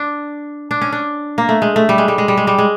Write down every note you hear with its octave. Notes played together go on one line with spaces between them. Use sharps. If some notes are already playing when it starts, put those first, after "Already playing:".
Already playing: D4
D4
C#4
D4
A#3
A3
G#3
A3
G3
G#3
G3
G#3
G3
G#3
G3
G#3